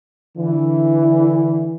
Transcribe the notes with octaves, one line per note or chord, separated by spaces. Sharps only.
D3 E3